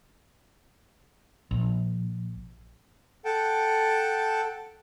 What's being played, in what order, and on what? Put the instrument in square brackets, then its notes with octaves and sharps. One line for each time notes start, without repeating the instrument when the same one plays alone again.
[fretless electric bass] A#1
[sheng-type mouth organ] A4 F#5 G5 A5